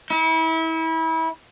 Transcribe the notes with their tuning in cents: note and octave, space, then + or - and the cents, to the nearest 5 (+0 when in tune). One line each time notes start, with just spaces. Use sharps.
E4 -30